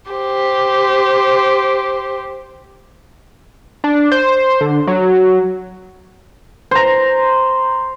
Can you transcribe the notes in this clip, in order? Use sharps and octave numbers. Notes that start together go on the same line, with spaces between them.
G4 C5
D4
C5
D3
F#3
C5 A#5